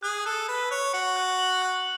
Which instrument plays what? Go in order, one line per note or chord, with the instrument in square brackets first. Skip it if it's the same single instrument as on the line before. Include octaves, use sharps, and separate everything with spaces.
[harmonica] G#4 [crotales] F#6
[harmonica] A4 [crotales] F#6
[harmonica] B4 [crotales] F#6
[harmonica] C#5 [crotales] F#6
[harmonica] F#4 [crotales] C#7
[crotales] F#6
F#7
F#6